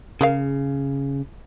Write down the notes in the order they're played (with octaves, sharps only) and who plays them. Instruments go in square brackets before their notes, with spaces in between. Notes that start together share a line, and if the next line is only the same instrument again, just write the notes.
[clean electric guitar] C#3 [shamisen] G#4 A#4 F5